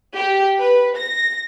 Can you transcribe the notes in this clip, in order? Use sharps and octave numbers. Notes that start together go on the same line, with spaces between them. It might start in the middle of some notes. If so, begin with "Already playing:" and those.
G4
B4
A#6